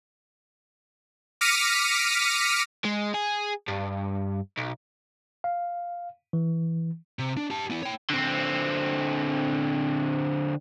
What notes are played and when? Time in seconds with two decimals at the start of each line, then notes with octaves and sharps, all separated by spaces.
1.41 D6 F6 A#6 B6 C#7 D#7
2.85 G#3
3.14 G#4
3.68 G2
4.58 B1
5.44 F5
6.33 E3
7.19 C3
7.37 D4
7.50 G4 A5
7.70 B3 E4
7.83 C#5 G5
8.10 D3 C4